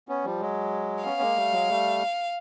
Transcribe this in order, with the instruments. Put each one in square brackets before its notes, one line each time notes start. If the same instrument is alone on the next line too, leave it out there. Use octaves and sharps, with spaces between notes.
[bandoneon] B3 C#4
F3 G3
F#3 G#3
[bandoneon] B3 C#4 [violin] F5
[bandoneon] G#3 A#3
G3 A3
F#3 G#3
G3 A3